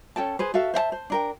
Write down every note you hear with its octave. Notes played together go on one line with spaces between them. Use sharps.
C#4 A4 G5 A5
G#4 B4 C5
F#4 A4 E5 F5
C5 E5 F5 A5
C5
D4 A#4 G5